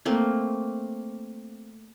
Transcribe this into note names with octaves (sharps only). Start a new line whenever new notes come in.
A3 A#3 C4